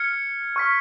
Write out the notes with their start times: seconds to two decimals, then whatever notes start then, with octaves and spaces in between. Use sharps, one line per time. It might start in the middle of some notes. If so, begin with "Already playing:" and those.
Already playing: F6 G#6 C#7
0.56 C#6 F6 B6